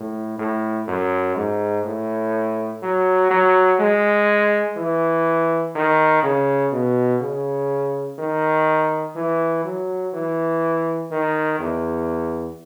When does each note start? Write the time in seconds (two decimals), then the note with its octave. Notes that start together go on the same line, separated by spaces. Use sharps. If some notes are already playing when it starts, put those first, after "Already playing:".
Already playing: A2
0.38 A2
0.87 F#2
1.36 G#2
1.85 A2
2.82 F#3
3.31 F#3
3.79 G#3
4.77 E3
5.75 D#3
6.23 C#3
6.72 B2
7.21 C#3
8.18 D#3
9.16 E3
9.64 F#3
10.13 E3
11.11 D#3
11.59 E2